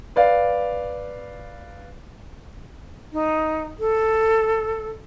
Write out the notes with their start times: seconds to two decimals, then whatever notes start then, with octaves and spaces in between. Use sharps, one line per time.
0.16 B4 D5 F5
3.13 D#4
3.80 A4